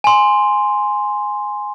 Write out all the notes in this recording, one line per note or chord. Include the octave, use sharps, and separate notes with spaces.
G#5 C6